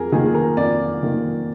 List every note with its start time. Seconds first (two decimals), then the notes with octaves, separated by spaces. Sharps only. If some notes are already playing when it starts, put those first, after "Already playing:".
Already playing: F2 G#4 A#4
0.12 D#3 A#3 G#4
0.35 A#4
0.57 F2 D5
1.02 D#3 A#3